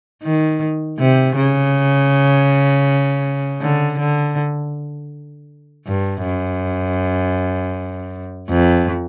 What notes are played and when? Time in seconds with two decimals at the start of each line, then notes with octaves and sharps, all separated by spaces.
0.23 D#3
0.99 C3
1.36 C#3
3.61 D3
3.99 D3
5.86 G2
6.23 F#2
8.49 F2